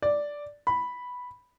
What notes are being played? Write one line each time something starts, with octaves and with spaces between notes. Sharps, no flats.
D5
B5